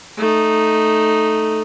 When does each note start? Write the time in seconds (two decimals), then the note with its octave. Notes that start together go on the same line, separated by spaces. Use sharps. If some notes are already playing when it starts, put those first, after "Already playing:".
0.18 A3 D#4